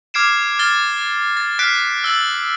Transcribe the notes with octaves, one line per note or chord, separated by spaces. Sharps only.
D6 F6 G#6 C7 D7 E7
F6 A6 G7
A6
F6 F#6 B6 C7 D7
E6 A6 F#7